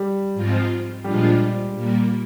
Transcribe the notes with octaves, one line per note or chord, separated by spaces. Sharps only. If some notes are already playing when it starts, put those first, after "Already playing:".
Already playing: G3 G4
G#2 F3 C4 F4
A#2 F3 G3 G#3 D4 F4 G4
A#2 G3 A#3